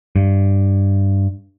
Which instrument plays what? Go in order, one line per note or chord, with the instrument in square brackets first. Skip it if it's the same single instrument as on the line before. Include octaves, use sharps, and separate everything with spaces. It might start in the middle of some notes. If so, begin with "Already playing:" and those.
[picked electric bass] G2